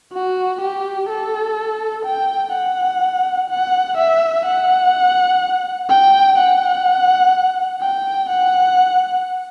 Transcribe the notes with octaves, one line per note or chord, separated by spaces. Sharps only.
F#4
G4
A4
G5
F#5
F#5
E5
F#5
G5
F#5
G5
F#5